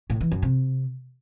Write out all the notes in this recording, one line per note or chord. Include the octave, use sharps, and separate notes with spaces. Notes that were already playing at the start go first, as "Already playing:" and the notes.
A2
E3
F#2
C3